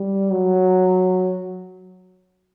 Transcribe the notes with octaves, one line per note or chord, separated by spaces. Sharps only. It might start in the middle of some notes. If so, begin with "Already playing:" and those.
Already playing: G3
F#3